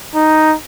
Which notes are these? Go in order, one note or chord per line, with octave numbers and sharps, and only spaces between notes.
D#4